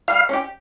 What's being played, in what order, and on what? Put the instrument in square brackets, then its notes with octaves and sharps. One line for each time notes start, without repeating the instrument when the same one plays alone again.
[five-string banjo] G3 [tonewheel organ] F5
[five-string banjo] C#4 G4